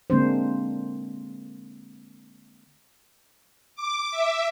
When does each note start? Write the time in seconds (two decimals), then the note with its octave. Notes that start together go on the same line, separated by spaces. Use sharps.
0.10 D3 G#3 A#3 C4 D4 C5
3.75 D6
4.11 E5